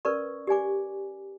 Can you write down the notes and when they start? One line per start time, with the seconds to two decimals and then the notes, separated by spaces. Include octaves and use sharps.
0.05 C#4 A#4 B4 D5 C#6
0.47 G4 D5 G#5 D6